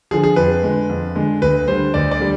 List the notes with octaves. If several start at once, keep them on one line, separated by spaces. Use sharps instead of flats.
D3 F3 G#4
G#4
F2 B4
D3 G#3
F2
D3 G#3
D2 B4
D3 G3 C5
D2 D5
D5
D3 G3